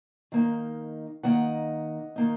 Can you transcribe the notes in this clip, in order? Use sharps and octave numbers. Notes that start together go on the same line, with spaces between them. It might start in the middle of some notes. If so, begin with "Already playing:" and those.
D#3 A#3 D#4
D#3 A#3 D#4 D#5 F#5
D#3 A#3 D#4